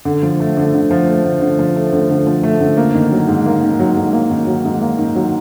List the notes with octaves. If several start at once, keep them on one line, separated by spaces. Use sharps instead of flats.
D3
F3
A3
D3
D3
F3
A3
D3
D3
F3
A3
D3
D3
F3
A3
D3
A#3
D#3
F#3
G#2
A#3
D#3
F#3
G#2
A#3
D#3
F#3
G#2
A#3
D#3
F#3